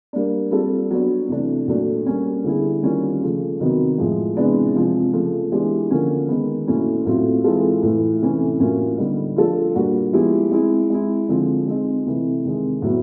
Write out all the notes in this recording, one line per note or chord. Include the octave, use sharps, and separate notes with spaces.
G3 A#3 D4
G3 C4 F4 A4
F#3 B3 D4
C3 E3 A3 D4
A#2 F#3 A3 D4
G3 A#3 C#4
D3 G3 B3 E4 G#4
D#3 G3 A#3 C#4 F4
C#3 F3 A3
C3 D#3 F#3 B3
A2 F3 G#3
C3 E3 G#3 B3 D4
C3 F3 G#3
C#3 F3 A3
E3 G#3 B3 D4 G4
D3 F3 A#3 C#4
D#3 G#3 B3
A#2 F#3 A3 C#4 E4
A2 F#3 A3 C4 F4
E3 G#3 C4 F4 A4
A2 E3 A3
C3 E3 A3 C#4
A2 F#3 A#3 C#4 F4
D3 G3 B3 D#4 G4
F3 A3 D4 F4 A4
A#2 G3 A#3 D4 F#4
F3 G#3 B3 E4 G4
G#3 C4 E4
G#3 C4 E4
D3 F3 G#3 C4
G#3 C4 D#4
C3 E3 A3
C3 D#3 G#3
A2 F#3 B3